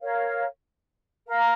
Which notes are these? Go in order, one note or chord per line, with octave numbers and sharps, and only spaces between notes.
A#4 C#5 F5
A#4 F5 A#5